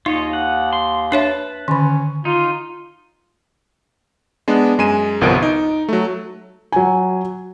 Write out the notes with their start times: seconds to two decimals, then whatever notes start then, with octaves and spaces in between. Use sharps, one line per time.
0.06 D#2 D#4 F4 C#5 D#5
0.33 F#5
0.73 C6
1.12 D4 B4 C#5 E5 A5
1.68 D3 D#3 C#4
2.25 D#4 F4
4.48 G#3 B3 D4
4.78 F#2 G#3 G#5 D#7 E7
5.21 G1 C2 F3 B3 A#4 D7
5.43 D#4
5.89 F#3 A3
6.72 F#3 G#5